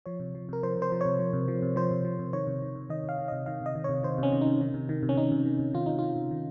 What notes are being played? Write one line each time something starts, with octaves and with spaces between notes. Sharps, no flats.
F3 C#5
C3
F3
C3 A#4
F3 C5
C3
C5
F3
C3 C#5
F3
C3
F3
C3
F3 C5
C3
F3
C3
D#3 C#5
C3
D#3
C3
D#3 D#5
C3 F5
D#3
C3 D#5
D#3 F5
C3 D#5
D#3
C3 C#5
D#3 C5
C3 C#4
D#3
D#4
C3
D#3
C3
D#3
C3
C#4
D#3 D#4
C3
D#3
C3
D#3 F4
C3 D#4
D#3 F4
C3
D#3